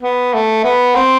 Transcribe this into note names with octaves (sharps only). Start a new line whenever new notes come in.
B3
A3
B3
C4